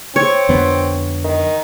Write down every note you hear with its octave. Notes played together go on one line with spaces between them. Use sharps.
C4 C#5
F2 D3 B3
D#3